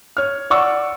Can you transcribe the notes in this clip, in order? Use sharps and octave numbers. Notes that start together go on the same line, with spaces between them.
C#5 F6
D5 F#5 C#6 D6 E6